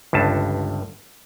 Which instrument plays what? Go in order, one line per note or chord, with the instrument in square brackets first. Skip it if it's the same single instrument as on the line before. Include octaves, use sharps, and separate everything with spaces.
[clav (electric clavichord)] G1 C#2 G2 A5